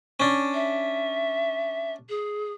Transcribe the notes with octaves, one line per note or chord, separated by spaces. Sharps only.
C#4 D4
E5
G#4